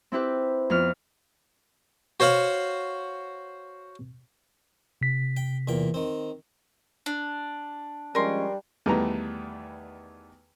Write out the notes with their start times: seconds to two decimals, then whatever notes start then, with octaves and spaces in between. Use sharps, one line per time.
0.12 C4 E4 G4 B4
0.70 F2 B3 F6
2.20 F#4 C5 C#5 F5 F#5
5.01 C3 B6
5.37 G5
5.68 E2 A#2 G5
5.94 D#3 C4
7.06 D4
8.15 F3 G3 G#3 C#4 A#4 C6
8.86 E2 D#3 G3 A3 B3 A#5